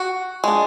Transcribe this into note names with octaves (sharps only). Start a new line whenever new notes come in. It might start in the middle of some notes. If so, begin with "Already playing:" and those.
Already playing: F#4
G#3 D4